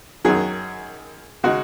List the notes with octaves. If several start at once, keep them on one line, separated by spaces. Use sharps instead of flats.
F#2 D#3 F#3 G#4
C#3 G#3 D#4 F#4